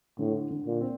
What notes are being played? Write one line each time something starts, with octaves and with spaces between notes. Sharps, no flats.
A2 D3
D3
A#2
C4